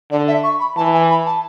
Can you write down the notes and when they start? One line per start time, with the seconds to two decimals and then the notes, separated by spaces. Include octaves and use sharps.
0.11 D3 D5
0.28 E5
0.44 C#6
0.60 B5
0.77 E3 A5
0.94 G#5
1.10 B5
1.26 A5